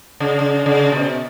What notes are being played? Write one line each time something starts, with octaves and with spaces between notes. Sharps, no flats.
C#3
C#3
C#3
B2